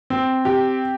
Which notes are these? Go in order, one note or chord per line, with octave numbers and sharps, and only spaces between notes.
C4
G4